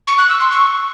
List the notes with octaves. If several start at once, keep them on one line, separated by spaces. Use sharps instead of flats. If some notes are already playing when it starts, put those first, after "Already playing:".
C#6
F#6
E6
C6
C#6